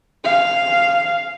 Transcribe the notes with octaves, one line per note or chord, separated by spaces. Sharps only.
F5